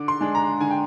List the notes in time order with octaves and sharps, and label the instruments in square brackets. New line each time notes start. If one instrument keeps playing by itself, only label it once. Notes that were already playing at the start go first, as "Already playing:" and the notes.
Already playing: [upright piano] D3 D6
C6
G#3 D4
A#5
D3 G#5
G5